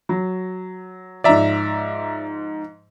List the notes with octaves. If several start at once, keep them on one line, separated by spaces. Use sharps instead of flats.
F#3
G#2 F3 D5 E5 A#5